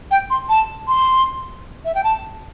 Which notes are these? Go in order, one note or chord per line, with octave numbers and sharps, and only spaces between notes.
G5
C6
A5
C6
E5
G5
A5